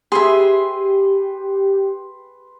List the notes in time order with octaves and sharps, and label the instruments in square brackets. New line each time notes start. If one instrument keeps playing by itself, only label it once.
[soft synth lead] G4 [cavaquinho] G#4 E5 [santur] B4 C6